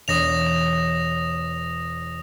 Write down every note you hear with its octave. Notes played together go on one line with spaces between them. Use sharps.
E1 C#5 D#6 A#6 E7 F7